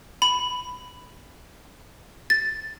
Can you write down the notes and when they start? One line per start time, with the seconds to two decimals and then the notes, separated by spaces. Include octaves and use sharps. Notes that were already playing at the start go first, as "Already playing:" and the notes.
0.22 B5
2.30 A6